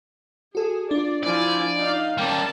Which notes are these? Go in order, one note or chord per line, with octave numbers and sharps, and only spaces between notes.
F#4 G#4 A4
D4 F4 D5
F3 E4 D5 G#5
D#4 F5
G3 A#3 C#4 A5